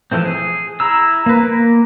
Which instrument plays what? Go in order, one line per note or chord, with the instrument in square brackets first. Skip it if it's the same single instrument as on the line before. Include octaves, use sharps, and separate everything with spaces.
[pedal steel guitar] E3 F3 A3 C4
G#4
E4 A#5 E6
A#3 B4
A#3